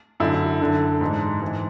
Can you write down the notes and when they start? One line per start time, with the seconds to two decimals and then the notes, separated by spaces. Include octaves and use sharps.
0.20 F#2 D3 E4
0.61 F#2 D3
1.01 G#2 E3
1.42 G#2 E3